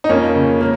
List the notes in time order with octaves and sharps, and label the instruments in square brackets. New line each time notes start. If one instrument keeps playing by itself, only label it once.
[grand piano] D#4
F2 A#3 C#4
C#3
A#3